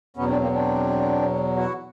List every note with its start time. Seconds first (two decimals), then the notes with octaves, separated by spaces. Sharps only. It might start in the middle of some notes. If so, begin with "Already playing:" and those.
0.17 E2 B2 F#3 B3 C#4
0.28 C4 D4
0.40 A#3 C4
0.52 C4 D4
1.56 E4 F#4